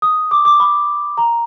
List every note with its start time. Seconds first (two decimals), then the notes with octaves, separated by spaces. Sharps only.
0.02 D#6
0.31 D6
0.45 D6
0.60 B5
1.18 A#5